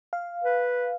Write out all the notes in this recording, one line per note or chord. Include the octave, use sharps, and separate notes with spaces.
F5
B4